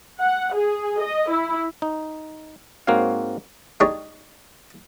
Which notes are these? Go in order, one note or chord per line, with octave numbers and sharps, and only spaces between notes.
F#5
G#4
D#5
E4
D#4
G#2 A#3 C4 F#4 C#5 F5
G#3 D4 D#4 G4 C#5